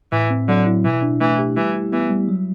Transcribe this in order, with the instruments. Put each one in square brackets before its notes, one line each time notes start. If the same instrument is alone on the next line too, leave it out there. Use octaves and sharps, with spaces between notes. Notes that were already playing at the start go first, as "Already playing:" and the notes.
[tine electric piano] A2 [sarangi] E3
[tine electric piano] C4
[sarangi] D3 [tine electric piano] F#3
[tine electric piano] E4
[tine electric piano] B2 [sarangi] E3
[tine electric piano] D4
[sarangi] E3 [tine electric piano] A3
[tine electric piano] G4
[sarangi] E3 [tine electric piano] G3
[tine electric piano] E4
[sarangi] E3 [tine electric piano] B3
[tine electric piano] G3
F#3